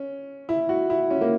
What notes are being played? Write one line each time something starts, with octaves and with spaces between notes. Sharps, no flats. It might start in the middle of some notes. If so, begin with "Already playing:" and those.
Already playing: C#4
E4
F#4
E4
C#4
A#3